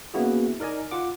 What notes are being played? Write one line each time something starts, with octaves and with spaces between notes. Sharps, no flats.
A#3 B3 C#4 E4 F#4 G#4
D#4 A#4 D5 D#5 G#5
F4 F#5 D6